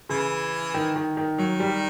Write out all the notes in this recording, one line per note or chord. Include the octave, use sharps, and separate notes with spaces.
C#3 E3
D#3
D#3
D#3
D#3 F#3
G3